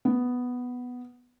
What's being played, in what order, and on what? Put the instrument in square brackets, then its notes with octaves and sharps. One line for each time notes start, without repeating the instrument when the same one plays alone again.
[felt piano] B3